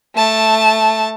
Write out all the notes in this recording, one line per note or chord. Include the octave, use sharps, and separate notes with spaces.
A3 A5